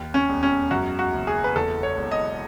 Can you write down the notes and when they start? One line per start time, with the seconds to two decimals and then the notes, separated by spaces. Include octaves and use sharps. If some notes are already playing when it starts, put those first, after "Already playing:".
Already playing: D#2
0.14 C#4
0.29 E1
0.43 C#4
0.71 F#2 F#4
0.99 F#4
1.13 F#1
1.27 G#4
1.44 B4
1.55 E2 A4
1.83 C#5
1.97 E1
2.11 D#5